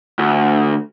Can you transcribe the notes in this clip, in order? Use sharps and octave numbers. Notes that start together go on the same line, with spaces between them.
D2